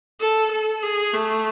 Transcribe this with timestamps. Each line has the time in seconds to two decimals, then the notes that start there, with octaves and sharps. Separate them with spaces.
0.21 A4
0.52 A4
0.83 G#4
1.14 A3